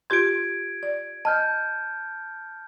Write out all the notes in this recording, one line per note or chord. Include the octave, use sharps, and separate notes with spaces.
F4 G4 C6 G#6 D7
D5
D#5 A5 F6 G6